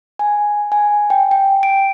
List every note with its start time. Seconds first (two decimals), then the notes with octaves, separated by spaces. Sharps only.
0.19 G#5
0.72 G#5
1.10 G5
1.31 G5
1.63 D7